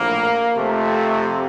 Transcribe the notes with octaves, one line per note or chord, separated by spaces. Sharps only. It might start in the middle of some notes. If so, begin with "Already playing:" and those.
Already playing: A#1 A2 F3 A#3
F2 C3 F3 A3